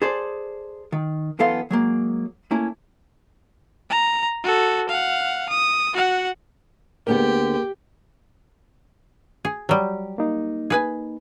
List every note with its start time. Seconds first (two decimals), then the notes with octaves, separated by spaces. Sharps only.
0.02 G#4 A4 C5 D5
0.92 D#3
1.39 F#2 E3 B3 A4 F5 C6
1.71 F#3 G#3 A#3
2.51 A3 A#3 C#4 E4
3.90 A#5
4.43 F#4 A4
4.89 F5 F#5
5.49 D#6
5.94 F#4 F#5
7.07 D2 D3 A#3 B3 G4 G#4 A#4
9.45 G#4
9.69 F#3 G3 G4
10.18 A#3 D#4
10.70 G#4 B4 G#5